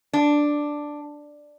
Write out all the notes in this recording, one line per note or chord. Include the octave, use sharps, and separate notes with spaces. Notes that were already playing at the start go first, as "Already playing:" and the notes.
D4